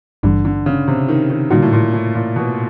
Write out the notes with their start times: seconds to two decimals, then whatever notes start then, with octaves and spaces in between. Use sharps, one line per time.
0.23 G#1 G2 D3 E3 G3
0.45 D3
0.66 C#3
0.88 C3
1.09 D#3
1.30 D#3
1.51 A#2 D3 G3 A#3 D#4 F#4
1.62 A2
1.73 A#2
1.93 A2
2.15 A#2
2.36 B2